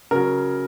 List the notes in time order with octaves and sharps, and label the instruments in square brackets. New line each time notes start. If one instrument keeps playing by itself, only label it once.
[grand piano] C#3 F#3 A#4